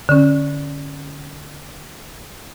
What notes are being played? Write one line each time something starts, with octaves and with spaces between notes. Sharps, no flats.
D3 C#4